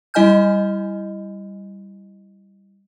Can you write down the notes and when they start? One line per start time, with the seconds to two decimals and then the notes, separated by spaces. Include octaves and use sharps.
0.14 G3 E4 D#5 G#5 F6 G6